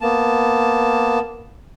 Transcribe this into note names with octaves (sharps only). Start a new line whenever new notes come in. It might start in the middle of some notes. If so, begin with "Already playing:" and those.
A#3 B3 A5